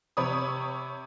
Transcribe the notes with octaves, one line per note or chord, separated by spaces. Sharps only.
C3 C#5 B5 D#6